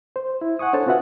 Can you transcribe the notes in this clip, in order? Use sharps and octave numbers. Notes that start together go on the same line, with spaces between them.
C5
E4
F#5 G#5 C#6 D#6
D4 A4 C5 C#5 A5
C4 F4 F#4 B4 E5 F#5